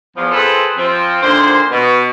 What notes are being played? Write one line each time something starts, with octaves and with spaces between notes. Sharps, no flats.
E2 F3
C4 F4 G#4 A4 B4 C5
F3 C4
A#2 D3 D#3 C5
B2